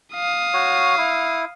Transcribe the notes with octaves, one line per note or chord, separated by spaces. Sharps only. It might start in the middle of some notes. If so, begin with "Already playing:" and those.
F5 D#6
F#4 C#5
E4